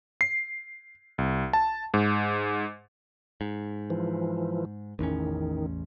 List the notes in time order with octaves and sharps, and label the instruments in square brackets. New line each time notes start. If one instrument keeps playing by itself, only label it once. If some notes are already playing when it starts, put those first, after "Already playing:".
[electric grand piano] C7
C2
A5
G#2
[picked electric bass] G#2
[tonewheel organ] E3 F3
[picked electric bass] A1 E2 C#4 [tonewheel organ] D#3